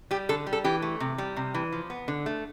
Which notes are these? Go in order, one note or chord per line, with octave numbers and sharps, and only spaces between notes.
G3 G4
D3 A4
G3
A4
E3 G4
A3
C3
G3
C3
E3
F3
B3
D3
A3